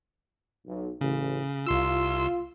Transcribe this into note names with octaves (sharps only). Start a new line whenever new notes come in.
B1
A1 C#3
C2 F4 C6 E6